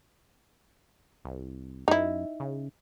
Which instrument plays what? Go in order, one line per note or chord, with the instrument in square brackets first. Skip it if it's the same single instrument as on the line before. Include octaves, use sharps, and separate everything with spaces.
[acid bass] C2
[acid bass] F#2 [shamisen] D#4 E4
[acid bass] C#3